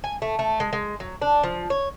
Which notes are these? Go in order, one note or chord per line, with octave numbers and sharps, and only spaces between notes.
G#5
A3
A3
G#3
G#3
F#3
D4
F3
C#5